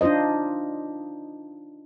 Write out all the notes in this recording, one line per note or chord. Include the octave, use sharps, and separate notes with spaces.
D4 D#4 F4 C5 D#5